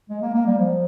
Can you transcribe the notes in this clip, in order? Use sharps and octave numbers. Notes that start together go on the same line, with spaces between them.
G#3
A#3
A#3
G3
F3